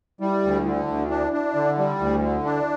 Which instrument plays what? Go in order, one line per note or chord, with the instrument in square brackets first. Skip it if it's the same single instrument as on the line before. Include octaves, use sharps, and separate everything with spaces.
[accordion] G3 [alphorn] E4
[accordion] D2
[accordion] D3 [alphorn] E4
[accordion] D2
[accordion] D4 [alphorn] E4
[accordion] D4
D3
G3
[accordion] D2 [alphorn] E4
[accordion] D3
D4